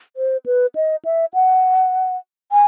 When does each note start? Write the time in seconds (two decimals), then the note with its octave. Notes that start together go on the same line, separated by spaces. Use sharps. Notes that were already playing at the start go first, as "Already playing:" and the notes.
0.17 C5
0.46 B4
0.75 D#5
1.05 E5
1.34 F#5
2.52 G#5